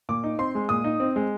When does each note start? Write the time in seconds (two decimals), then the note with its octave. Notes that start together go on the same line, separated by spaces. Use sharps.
0.09 A#2 D6
0.24 D#4
0.39 C4 C6
0.55 G#3
0.69 A#2 D#6
0.84 D#4
1.00 C4
1.16 G#3